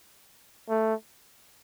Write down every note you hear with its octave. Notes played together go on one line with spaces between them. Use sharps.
A3